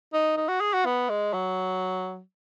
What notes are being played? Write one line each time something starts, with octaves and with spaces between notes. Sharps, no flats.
D#4
D#4
F#4
G#4
F#4
B3
G#3
F#3